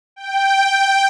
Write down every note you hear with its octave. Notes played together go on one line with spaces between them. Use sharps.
G5